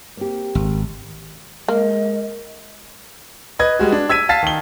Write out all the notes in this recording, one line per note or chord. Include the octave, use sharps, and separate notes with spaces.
A#3 C4 G4
G#1
G#3 A#3 A#4 D#5
B4 D#5 G#6
G3 G#3 F#4
D4
E6 G#6 B6 D#7
F5 A5 A6 B6 C7
D#3 G7